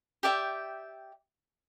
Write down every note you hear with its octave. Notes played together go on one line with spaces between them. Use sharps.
G4 D5 E5 G5